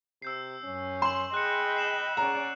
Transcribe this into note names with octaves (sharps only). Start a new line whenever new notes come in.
C3 E6 G6 C7
F#2 C#4
C6 E7 F#7
G#4 D#5 G5 B5 F#6 C#7
C7 E7 F#7
C#4 G#4 D5 F#5 A#5